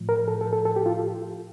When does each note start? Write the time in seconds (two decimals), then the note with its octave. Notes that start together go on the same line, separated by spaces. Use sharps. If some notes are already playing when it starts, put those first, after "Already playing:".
Already playing: A2 F3
0.09 A#4
0.28 A4
0.41 A4
0.53 A4
0.65 A4
0.76 G4
0.86 F4